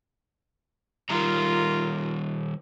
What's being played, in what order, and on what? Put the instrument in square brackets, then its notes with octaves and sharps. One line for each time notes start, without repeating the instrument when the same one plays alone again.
[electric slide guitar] D#3 G3 A#5 [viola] F4 A#4